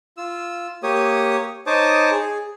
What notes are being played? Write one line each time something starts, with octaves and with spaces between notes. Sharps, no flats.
F4 E6
A#3 G4 C#5 D#6
D#4 C5 C#5 A5 D6 D#6
G#4